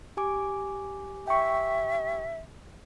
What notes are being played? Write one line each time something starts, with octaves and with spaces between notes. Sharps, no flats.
G4 G#5 D6
E5 G5 C#6